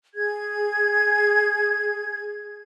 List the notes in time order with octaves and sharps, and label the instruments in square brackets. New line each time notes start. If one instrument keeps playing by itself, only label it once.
[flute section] G#4 G#6